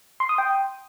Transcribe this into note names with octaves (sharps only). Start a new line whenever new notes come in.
C6
D#6
G5